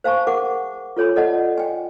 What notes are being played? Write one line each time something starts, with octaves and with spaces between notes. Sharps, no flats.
C5 F5 G#5 A5 C#6
G#4 A#4 F#5 D6
F4 A4 C#5 G#5 B5
A4 D5 D#5 F#5 A5
G5 G#5